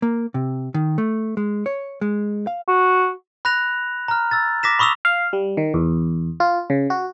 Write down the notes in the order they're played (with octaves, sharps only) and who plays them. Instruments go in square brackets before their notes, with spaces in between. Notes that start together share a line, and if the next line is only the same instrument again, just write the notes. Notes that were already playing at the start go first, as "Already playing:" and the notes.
[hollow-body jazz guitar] A#3
C3
D#3
A3
G#3
C#5
G#3
F5
[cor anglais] F#4
[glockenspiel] B5 F#6 A#6 F7
A#5 F6
E6 A6
D6 A#6 B6 E7
B5 C#6 D#6 E6 F7
[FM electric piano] F5
G3
D#3
E2
F4
C#3
F#4